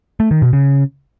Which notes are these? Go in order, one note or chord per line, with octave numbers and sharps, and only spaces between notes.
A3
D#3
B2
C#3